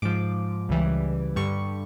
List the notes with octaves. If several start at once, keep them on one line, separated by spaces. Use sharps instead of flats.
G#2 F3 D6
C#2 C#3 E3 G3
G2 D3 G3 C#6